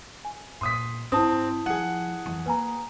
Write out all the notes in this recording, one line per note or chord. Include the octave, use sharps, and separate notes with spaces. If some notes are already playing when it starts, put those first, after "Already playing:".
G#5
A#2 C6 D#6 B6
G#2 C4 E4 A5 D#6
F3 G#4 F#5
F2 E3
A#3 B4 G#5 A#5